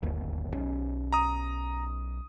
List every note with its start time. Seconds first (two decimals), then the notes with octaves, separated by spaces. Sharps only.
0.03 D1 G1 D#2
0.54 B1 C#4
1.13 A#5 D#6